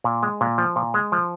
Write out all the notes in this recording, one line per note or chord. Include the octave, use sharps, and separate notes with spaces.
A#2
G#3
A#2
F3
A#2
G#3
F3